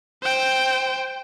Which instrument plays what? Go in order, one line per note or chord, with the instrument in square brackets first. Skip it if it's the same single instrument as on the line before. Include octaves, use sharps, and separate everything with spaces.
[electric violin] C5 G5